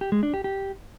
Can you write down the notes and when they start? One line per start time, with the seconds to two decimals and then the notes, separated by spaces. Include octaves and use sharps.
0.01 G4
0.12 G#3
0.23 D4
0.34 G4
0.44 G4